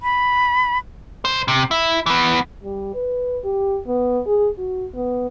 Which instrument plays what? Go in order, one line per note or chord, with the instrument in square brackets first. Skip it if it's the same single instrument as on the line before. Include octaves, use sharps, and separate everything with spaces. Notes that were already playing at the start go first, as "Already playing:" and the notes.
[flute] B5
[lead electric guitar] B1 C5
C3
E4
E3 B3
[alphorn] G3
B4
G4
B3
G#4
F#4
B3